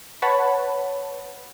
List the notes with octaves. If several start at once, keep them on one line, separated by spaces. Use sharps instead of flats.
B4 C#5 F#5 A5 B5